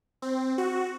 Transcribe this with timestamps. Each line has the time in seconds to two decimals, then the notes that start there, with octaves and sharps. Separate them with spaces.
0.22 C4
0.58 F#4